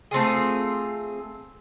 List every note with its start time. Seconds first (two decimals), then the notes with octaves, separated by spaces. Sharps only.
0.11 A3 C4 F4 G#4